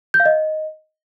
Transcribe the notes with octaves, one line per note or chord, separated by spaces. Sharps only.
G6
F5
D#5